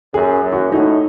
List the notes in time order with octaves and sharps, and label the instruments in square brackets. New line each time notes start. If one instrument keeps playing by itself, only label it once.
[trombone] F#2 [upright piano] G#4
[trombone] F#2
[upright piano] F#4
[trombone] A2 [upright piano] D#4